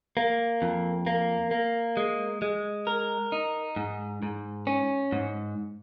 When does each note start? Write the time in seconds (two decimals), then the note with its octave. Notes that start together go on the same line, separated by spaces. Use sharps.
0.17 A#3
0.62 F2
1.07 A#3
1.51 A#3
1.97 G#3
2.42 G#3
2.87 A#4
3.32 D#4
3.76 G#2
4.23 G#2
4.67 C#4
5.12 G#2